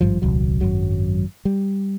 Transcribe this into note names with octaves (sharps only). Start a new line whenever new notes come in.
G#1 G2 F3
D#1 C2 F#3
G#1 F#2 F#3
G3